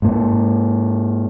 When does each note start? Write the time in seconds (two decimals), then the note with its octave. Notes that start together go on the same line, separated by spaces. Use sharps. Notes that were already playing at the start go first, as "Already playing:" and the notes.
0.02 G#2 A#3